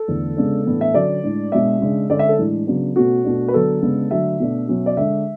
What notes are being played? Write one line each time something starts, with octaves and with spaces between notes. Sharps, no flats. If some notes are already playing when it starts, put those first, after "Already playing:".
Already playing: A4
E2 D3 A3
C#3 G#3 B3 D4
A2 E3 B3 D4
E5
D3 F#3 C#4 D5
A2 G#3 D4
B2 G#3 D4 E5
C#3 G#3 D4
D3 G#3 C#4 D5
E5
A4
A2 E3 G#3 D4
C#3 F#3 B3 D4
B2 A3 C#4 F#4
B2 A3 D4
B4
D3 F#3 B3 A4
C#3 G#3 B3 D4
D3 F#3 A3 D4 E5
B2 A3 D4
B2 F#3 C#4
D5
D3 G#3 D4 E5